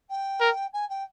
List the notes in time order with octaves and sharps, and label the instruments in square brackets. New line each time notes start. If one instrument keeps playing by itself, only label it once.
[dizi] G5
[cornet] A#4
[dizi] G#5
G5